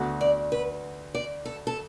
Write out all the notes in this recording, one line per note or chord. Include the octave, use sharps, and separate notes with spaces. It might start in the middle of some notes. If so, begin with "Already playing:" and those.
Already playing: D2 D3 B3 F#4
D5
B4
D5
A4
A4